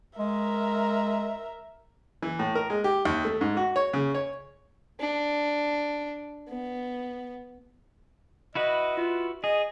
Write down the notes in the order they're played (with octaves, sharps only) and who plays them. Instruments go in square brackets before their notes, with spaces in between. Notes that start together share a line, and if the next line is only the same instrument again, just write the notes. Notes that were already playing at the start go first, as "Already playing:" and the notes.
[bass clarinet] G#3 [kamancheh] A#4 E5
[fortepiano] E3
A2
A#4
G#3
G4
D#2
A3
G#2
F#4
C#5
C#3
C#5
[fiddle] D4
B3
[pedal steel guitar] E4 F#4 B4 [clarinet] D#5
[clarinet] F4
[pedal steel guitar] G#4 [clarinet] D#5